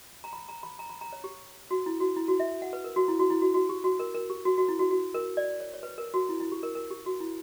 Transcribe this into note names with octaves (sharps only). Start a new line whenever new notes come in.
A#5
B5
A#5
B5
A#5
B5
A#5
C#5
G4
F#4
E4
F#4
E4
F#4
E5
F#5
B4
A#4
F#4
E4
F#4
E4
F#4
F#4
G4
F#4
A#4
A#4
G4
F#4
F#4
E4
F#4
F#4
A#4
D5
C#5
C#5
B4
A#4
F#4
E4
E4
G4
A#4
A#4
G4
F#4
E4